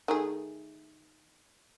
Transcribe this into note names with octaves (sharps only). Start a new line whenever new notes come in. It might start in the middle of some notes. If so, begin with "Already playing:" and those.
D#3 A3 G#4